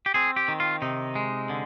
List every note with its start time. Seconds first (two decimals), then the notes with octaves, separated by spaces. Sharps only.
0.06 G4
0.14 C4 G#4
0.36 G4
0.48 D#3
0.60 F4
0.82 C3 D#4
1.15 G#3
1.50 D3